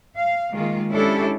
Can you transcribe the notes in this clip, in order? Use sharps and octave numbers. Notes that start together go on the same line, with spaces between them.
F5
D#3 G#3 A#3 F4
G#3 C#4 D4 E4 G4 A4